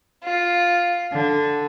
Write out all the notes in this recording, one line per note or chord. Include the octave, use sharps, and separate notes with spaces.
F4
D3